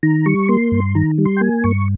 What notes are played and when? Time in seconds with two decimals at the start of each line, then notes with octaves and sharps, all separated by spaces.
0.03 D#3 A#5
0.26 G3 C#6
0.48 A#3 C6
0.72 G2
0.95 D#3 A#5
1.18 G3
1.26 C6
1.37 G5
1.41 A#3 G#5
1.64 G2 C#6